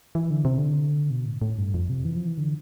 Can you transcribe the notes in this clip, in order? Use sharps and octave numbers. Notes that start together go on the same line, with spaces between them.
E3
D3
C3
D3
B2
A2
A2
G2
F2
C3
E3
F3
E3
D3